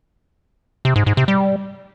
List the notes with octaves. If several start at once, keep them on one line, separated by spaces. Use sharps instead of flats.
C3
G#2
G#2
C3
G3